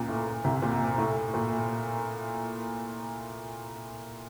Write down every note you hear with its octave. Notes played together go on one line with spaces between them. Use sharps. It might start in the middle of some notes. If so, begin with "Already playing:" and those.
Already playing: C#2 A#2 C#3
A2
C2 C3
A#2
A2
A#2